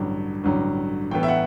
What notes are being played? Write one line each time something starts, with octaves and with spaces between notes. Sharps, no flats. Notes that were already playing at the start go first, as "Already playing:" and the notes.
Already playing: A1 G2 D3 F#3
A1 G2 D3 F#3
A2 E3 B3 G5
E5
F#5